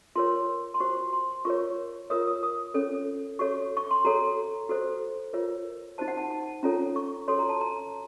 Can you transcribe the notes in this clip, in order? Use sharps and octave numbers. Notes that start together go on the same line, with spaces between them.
F4 A#4 C#5 C6
C6
F#4 C5 C#6
C6
F4 A#4 C#5 C#6
F4 A#4 C#5 D#6
D#6
D#6
C#4 A4 C#5
F#4 A4 C#5 C#6
C#6
C6
F#4 A4 C#5 A#5
F#4 A4 C5
F4 A#4 C#5
D#4 F#4 C5 A5
F#5
A5
A5
C#4 F4 A4 C#5 A#5
C#6
F#4 A4 C#5 C6
A#5
A5
A#5